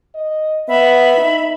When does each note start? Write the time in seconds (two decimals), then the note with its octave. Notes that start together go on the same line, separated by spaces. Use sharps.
0.15 D#5
0.69 B3 E5 B5
1.17 D#4